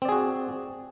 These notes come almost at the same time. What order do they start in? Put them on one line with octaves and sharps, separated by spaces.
C4 D5 G#4 F#4